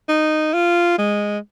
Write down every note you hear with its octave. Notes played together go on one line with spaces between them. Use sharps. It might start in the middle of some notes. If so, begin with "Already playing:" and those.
D#4
F4
G#3